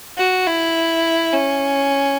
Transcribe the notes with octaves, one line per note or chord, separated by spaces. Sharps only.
F#4
E4
C#4